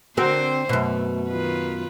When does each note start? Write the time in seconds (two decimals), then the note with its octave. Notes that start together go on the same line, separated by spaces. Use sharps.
0.17 D3 C4 F#4 A#4 C5
0.69 F#2 B2 A3
1.28 D#3 F4 B4